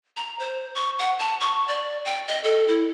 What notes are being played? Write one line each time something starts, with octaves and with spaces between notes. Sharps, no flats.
A#5
C5
C#6
F#5
A5
C#6
D5
G5
D#5
A4
E4